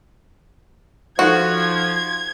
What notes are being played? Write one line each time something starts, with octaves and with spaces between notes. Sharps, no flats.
F3 D#4 F#4 A4 F#6 G#6